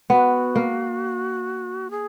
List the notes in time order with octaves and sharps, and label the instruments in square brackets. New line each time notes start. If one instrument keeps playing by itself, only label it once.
[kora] B3 [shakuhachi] F#4
[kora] A#3
[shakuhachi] G#4